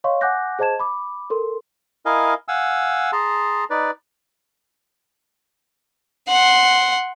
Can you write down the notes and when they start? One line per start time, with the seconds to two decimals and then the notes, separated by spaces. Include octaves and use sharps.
0.04 C#5 D#5 F5 C6 C#6
0.21 F#5 G#5 D6 F#6 G6 A#6
0.59 G#4 C5 D#5 A5 G#6 E7
0.79 B5 D6
1.30 A4 A#4 C6
2.06 E4 A#4 D#5 F5 G#5
2.48 F5 F#5 G#5 E6
3.12 G#4 A5 A#5 C6
3.70 D#4 B4 D5
6.29 F#5 C6